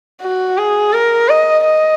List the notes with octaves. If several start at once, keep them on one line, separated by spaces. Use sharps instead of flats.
F#4
G#4
A#4
D#5
D#5